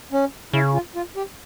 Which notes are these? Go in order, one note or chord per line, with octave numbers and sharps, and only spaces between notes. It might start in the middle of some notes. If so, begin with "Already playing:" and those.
C#4
C#3 E4
F4
F4
G4